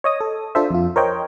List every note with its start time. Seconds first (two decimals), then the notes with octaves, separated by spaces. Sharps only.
0.04 C#5 D#5 D#6
0.21 A4
0.55 D4 F4 A4 C5 E5
0.71 F2 F4
0.96 A#4 C5 C#5 D#5 G5